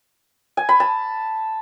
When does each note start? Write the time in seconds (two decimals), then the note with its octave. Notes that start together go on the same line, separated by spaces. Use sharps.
0.57 G#5
0.69 B5
0.80 A5